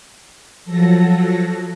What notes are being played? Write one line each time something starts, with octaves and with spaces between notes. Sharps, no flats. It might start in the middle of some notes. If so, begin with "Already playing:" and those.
F3 F#3 A4 A#6